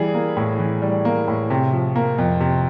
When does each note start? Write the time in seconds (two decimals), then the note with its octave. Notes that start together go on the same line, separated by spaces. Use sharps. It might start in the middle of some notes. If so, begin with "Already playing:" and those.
Already playing: E3 G3 G#4
0.14 A#3
0.37 A2
0.59 E3
0.82 G3
1.05 A#3
1.28 A2
1.50 C3
1.73 F3
1.96 A#3
2.18 F2
2.41 C3